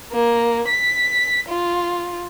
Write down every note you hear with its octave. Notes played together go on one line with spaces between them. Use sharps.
A#3
B6
F4